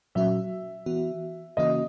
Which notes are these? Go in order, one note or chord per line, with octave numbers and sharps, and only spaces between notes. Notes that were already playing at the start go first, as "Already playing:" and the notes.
A#2 F#3 C#4 F#4 E5
E3 B3 F#4
C#3 E3 A#3 C#4 F#4 D#5